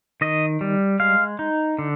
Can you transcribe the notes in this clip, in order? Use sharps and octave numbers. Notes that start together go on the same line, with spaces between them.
D#3 D#5
G3
G#3 F5
D#4
D3